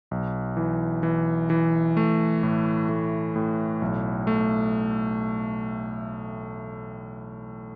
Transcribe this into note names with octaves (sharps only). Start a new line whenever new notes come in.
B1
E3
E3
E3
A3
A2
A3
A2
B1
A3